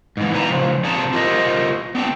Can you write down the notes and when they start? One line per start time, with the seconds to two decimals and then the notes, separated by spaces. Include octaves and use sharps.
0.17 G#2 E3
0.33 B2 G4 B4 D5 G#5 A#5
0.50 C#3 E3 F3
0.84 F2 C3 G#4 D5 A5 A#5
1.13 F4 G4 G#4 A#4 C5 D#5
1.95 B3 D4 G5